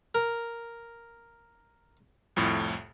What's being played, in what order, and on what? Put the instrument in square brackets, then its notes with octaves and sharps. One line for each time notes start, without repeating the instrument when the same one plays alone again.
[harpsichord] A#4
[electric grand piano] C2 F2 A2